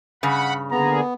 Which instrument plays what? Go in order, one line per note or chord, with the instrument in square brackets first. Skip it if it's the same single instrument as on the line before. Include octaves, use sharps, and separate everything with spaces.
[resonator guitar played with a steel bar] G2 C#3 [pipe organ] F#5 B5
[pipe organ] D3 A#3 G#4 [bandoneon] B3 [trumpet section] A#5